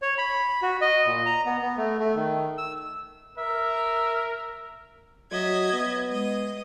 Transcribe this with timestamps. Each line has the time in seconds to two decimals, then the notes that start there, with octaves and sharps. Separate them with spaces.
0.02 C#5
0.18 B5
0.62 F#4
0.81 D#5
1.06 A#2
1.26 A#5
1.46 B3
1.62 B3
1.77 A3
1.99 A3
2.15 D#3
2.58 E6
3.38 A#4 E5
5.32 F#3 D#5 E5 G#6
5.72 B3
6.10 G#3 D#5